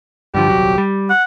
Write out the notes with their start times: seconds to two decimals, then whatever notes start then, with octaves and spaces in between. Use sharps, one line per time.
0.34 G2 D3 F3 G4
0.48 D#1 C2 F#3
0.78 G3
1.10 F#5